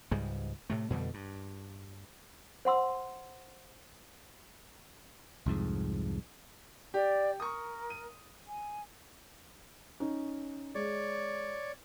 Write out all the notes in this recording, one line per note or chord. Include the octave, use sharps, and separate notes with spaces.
C#2 G#2 G3 G#3
A2 C3 A3
F2 B2 D3 G3
G2
C5 F#5 C6 E6
C2 F2 G#2
G4 D5
A#4 C#6 D#6
D#7
G#5
C#4 D#4
G#3 C#5 D5